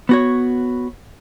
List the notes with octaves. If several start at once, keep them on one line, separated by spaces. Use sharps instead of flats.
B3 F#4 C#5